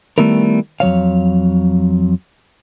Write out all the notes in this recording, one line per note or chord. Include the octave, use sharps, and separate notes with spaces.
D#3 G3 A3 B3 E4 A#4
F2 F#3 C#5 F5